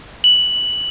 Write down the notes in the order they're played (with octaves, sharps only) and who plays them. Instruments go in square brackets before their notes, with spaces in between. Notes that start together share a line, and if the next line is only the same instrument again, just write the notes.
[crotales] F#7